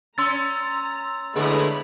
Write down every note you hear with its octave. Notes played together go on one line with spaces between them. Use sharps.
C#4 A#5 C6 E6 A6
D3 G#3 A3 B3 E4 C#5 B5